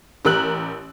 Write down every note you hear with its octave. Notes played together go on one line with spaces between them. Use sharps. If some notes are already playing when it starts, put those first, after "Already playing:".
A1 G4 A#4 E6 F#6 F#7